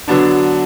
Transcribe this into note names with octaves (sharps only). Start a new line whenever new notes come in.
D3 F#3 B3 D4